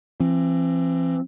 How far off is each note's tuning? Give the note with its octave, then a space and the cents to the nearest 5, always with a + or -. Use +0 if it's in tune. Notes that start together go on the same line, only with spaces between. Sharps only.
E3 +45 C4 +20